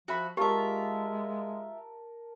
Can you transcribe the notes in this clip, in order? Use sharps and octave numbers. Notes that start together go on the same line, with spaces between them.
F3 F#4 E5 B5
G#3 F4 G4 A#4 E5 A5 A#5